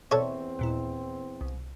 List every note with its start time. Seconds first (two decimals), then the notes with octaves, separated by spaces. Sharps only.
0.11 E2 C4 A4 C#5 D5 E5 C#6
0.59 D#2 A#2 E4
1.41 C2